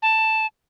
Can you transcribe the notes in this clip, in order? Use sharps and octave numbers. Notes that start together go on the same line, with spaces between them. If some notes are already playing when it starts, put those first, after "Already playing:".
A5